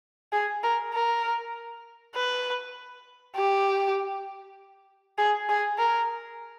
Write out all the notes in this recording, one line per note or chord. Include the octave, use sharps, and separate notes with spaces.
G#4
A#4
A#4
B4
G4
G#4
G#4
A#4